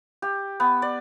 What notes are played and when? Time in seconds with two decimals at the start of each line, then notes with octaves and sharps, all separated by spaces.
0.22 G4
0.60 B3
0.82 D5